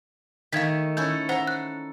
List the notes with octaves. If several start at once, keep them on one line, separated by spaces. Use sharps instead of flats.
D#3 A3 F5 G#6 B6
C#4 E4 A4 G6
A4 C5 F#5 A#5
F#6